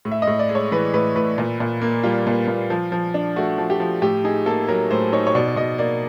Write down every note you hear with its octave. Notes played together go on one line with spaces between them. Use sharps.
A2
E5
D#5
A2
D5
G#3
C#5
E3 B4
A2 B4
A2 B4
A#2
A#2
A#3
G3 F4
A#2
A#2
F3
F3
D4
A3 F#4
F3
G4
F3
A2 G4
D#4 G#4
A#3 A4
F#3 A#4
A2 C5
D#4 C#5
C#5
B2 D5
D5
B2 D#5
A#3 D5